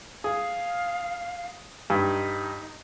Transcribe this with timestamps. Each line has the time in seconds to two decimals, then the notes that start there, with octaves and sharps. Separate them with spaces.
0.24 G#4 F5
1.90 G2 D#4